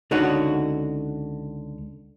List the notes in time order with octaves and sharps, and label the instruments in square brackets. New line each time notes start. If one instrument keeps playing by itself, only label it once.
[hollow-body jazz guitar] C#2 D3 D#4 F#4 C#5 F#5